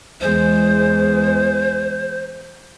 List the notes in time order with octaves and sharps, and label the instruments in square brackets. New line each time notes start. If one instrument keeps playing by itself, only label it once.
[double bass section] E2 E3 G#3 [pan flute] C5